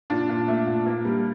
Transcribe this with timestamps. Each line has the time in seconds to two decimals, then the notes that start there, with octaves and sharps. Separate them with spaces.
0.10 A#2 D4
0.29 A#2
0.48 A3
0.67 A#2
0.86 A#3
1.05 G3